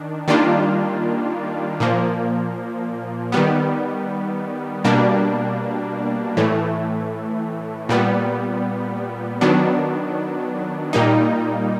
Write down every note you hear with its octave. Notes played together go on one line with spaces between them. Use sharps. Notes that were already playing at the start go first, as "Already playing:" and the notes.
Already playing: D#3 D4
D#3 G3 A#3 D4 F4
A#2 F3 A#3
D#3 G3 B3
B2 G3 A#3 D4
A2 E3 A3
A#2 G3 B3
D#3 F#3 B3 D4
A#2 G3 A#3 D#4